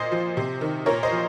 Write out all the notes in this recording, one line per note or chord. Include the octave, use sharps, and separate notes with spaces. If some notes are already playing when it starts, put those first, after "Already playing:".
Already playing: A#2 C5 D#5
F3
C3
D#3
A#2 A#4 C#5
C5 D#5
F3